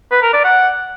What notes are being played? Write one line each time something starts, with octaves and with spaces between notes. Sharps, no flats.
B4
A#4
D5
F#5